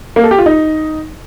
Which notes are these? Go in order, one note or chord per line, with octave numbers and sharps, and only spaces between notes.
A#3
A4
G4
F4
D#4